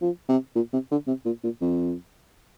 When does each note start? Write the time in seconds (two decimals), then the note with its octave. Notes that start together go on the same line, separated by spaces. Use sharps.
0.02 F3
0.29 C3
0.55 A#2
0.73 C3
0.91 D3
1.08 C3
1.25 A#2
1.44 A#2
1.61 F2